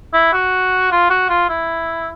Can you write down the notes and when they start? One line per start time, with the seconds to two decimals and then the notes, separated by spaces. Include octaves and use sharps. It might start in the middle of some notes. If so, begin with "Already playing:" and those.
0.13 E4
0.33 F#4
0.91 F4
1.10 F#4
1.29 F4
1.49 E4